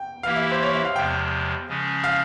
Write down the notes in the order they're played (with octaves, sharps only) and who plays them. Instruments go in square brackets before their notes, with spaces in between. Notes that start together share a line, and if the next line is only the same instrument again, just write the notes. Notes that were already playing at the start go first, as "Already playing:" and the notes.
Already playing: [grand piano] G5
[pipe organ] E3 A#3 E4 G4 [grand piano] F5
[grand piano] E5
C5
C#5
E5
F5
[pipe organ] E2 C3 F3 G#3 [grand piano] G5
[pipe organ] C#3 F3 G#3 C#4
[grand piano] F5